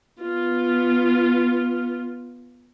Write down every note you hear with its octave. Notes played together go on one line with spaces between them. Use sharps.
B3 F4